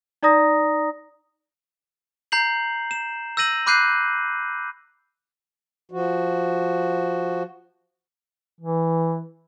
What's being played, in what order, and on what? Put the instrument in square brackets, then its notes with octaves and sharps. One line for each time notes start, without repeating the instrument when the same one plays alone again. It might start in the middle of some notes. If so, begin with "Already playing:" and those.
[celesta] D#4 D5 A#5 D#6 A#6
[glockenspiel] A#5 G6 C7 F#7
E7
E6 G6 A#6 D#7 F#7
B5 D6 F#6 G6 C7 D#7
[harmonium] F3 F#4
[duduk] E3